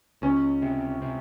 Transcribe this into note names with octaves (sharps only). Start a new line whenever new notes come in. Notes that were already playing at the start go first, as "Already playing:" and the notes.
C#2 C#4
C3
C3